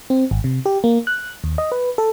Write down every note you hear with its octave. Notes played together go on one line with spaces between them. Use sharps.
C4
G#1
C3
G4
A#3
F#6
D#2
D#5
B4
A4